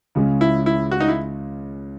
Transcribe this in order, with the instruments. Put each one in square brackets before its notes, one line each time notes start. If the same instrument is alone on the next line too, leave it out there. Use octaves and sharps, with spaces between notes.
[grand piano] C#2 C#3 G#3 C#4
[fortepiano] E4
E4
F#4
D#4
E4